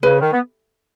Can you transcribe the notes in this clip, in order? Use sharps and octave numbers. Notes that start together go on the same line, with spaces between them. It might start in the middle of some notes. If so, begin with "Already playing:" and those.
C#3 B4
D#3
B3